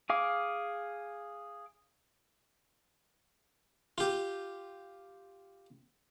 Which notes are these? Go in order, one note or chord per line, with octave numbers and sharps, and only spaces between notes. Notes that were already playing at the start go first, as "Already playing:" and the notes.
G#4 F5 D6
F4 G4